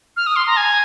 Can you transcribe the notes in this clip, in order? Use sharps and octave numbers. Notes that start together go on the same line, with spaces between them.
F6
D#6
C6
A#5
G#5